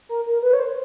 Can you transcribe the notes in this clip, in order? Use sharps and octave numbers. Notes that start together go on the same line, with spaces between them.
A#4
A#4
B4
C#5
C5